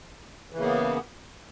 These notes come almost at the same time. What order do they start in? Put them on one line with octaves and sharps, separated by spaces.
E3 C#3 A#3 B3